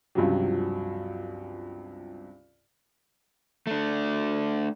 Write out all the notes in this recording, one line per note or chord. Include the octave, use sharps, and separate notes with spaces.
C#2 G2 C3 F3 F#3
A3 D4